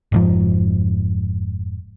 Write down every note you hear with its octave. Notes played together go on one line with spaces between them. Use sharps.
F1 G#2 F3